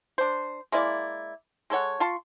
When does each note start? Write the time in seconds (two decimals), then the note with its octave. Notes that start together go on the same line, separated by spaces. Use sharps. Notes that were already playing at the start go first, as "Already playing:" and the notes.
0.18 D4 C5
0.72 G#3 A#3 E4 D5
1.70 G#3 A4 C#5 F#5
2.00 F4 A5 C6 C#6